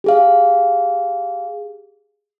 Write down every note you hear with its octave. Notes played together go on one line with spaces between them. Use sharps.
G4 G#4 F5